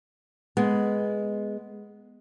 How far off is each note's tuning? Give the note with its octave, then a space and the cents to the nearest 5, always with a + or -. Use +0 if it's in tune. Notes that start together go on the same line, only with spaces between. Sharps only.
G#3 +0 B3 +0